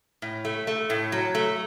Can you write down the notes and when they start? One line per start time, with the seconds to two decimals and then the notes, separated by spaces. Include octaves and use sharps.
0.22 A2
0.45 A3
0.67 A3
0.90 A2
1.12 F#3
1.35 A3